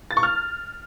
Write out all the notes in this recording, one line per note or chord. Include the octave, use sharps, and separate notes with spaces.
A6
C#6
F6